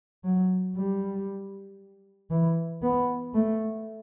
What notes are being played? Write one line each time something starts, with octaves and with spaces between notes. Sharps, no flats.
F#3
G3
E3
B3
A3